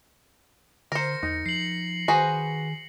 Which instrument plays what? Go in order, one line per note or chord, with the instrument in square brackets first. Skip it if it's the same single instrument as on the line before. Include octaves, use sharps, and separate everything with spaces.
[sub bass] D3 [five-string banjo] A#4 C5 [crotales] A#6 C#7
[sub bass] E2 [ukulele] D#4
[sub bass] F3 [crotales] C7 F#7
[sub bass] D#3 [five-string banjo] F#4 B4 C5 [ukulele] G#4